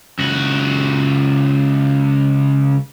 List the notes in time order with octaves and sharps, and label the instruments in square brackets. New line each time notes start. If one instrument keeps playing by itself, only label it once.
[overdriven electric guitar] C#2 F#4